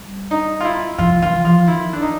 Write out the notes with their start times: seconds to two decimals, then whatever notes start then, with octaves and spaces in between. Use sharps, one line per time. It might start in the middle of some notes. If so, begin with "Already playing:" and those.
Already playing: G3
0.31 D#4
0.61 F4
0.65 E4
0.98 F3 F4
1.22 E3 F4
1.44 F3 F4
1.67 D#3 E4
1.93 D4
2.02 D#4